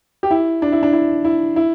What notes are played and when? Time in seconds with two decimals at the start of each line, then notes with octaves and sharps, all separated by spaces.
0.23 G4
0.31 E4
0.62 D4
0.72 E4
0.83 D4
0.93 E4
1.25 E4
1.56 E4